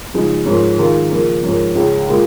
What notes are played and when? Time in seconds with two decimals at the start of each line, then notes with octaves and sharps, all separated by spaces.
0.14 C#3 F3 G#3 D#4
0.46 G#2 F3 C#4 A#4
0.79 D#3 G#3 F4 A#4
1.11 C#3 F3 A#3
1.43 G#2 F3 C#4 A#4
1.75 C#2 C#3 G#3 C#4
2.07 A#2 G#3 F4 A#4